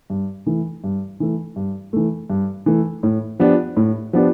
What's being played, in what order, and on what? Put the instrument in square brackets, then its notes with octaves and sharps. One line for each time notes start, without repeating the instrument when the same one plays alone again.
[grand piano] G2
E3 A3
G2
E3 A3
G2
E3 A3
G2
E3 A3
A2
F3 B3 D4 G4
A2
F3 B3 D4 G4